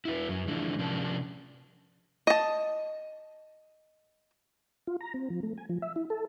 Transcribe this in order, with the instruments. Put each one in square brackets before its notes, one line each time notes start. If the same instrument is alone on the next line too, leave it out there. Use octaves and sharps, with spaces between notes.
[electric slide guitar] E4 F#4 B4
F#2 F#3
D3 E3 F3 G#3 D4
C3 F3 C#4 D4 A#4 A5
[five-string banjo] D#5 A5
[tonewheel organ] F4
A#5
C4
F3
A3
G#5
F3
E5
E4
A4